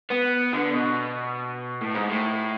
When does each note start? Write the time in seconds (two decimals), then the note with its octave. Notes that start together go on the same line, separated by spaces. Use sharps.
0.10 B3
0.53 D3
0.74 B2
1.81 A2
1.95 G#2
2.08 A2